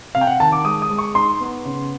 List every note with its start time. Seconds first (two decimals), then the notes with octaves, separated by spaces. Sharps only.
0.15 C3 F5
0.21 G5
0.27 F#5
0.40 D#3 A5
0.52 D6
0.65 G#3 D#6
0.82 D#6
0.90 G#3
0.98 C#6
1.15 D#4 C6
1.41 B3
1.65 C#3